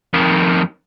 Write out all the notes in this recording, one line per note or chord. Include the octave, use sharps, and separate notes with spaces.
F2 D#3